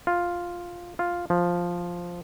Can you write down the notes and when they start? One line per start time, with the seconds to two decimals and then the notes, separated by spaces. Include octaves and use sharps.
0.07 F4
0.99 F4
1.30 F3